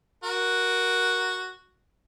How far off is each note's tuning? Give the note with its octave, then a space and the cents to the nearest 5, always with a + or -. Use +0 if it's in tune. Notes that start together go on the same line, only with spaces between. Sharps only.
F#4 +0 A#4 +15